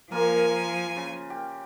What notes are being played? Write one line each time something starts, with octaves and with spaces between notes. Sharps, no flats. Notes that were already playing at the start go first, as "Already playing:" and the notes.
F3 A#3 F4 A#4 G#5
C#3
G4